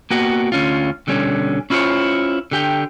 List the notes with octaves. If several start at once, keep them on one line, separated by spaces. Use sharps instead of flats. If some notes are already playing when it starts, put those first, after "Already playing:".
A#3 B3 F#4 G4
D2 C#4 F4
B2 D3 G3 C#4
C#4 E4 F4 C5 C#5
D3 G4 G5